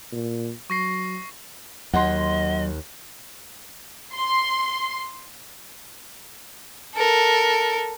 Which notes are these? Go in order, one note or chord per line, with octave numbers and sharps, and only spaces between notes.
A#2
F#3 C#6 A#6 C7
D#2 F#3 D#5 F#5 C6
C6
A4 A#4